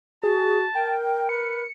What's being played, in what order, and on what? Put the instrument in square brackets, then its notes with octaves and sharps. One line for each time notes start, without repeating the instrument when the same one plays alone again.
[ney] F#4 [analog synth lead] G#4 [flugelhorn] A5
[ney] A#4 [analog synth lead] G5
[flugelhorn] B4 [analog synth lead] C#7